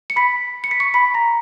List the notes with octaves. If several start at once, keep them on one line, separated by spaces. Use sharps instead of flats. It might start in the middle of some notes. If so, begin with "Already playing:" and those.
C#7
B5 B6
C#7
B6
C#6 C#7
B5 B6
A#5 A#6